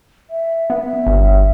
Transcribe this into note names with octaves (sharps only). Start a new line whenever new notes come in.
E5
B3 E5
G1